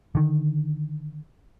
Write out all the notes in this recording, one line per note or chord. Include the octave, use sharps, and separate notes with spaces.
D3 D#3